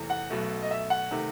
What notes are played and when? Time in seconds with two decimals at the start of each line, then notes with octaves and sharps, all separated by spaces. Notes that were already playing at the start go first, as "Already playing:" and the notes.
Already playing: E2 C3 E3 A3
0.10 F#5
0.30 B1 B2 A3
0.62 D#5
0.71 E5
0.90 F#5
1.11 C3 D#3 A3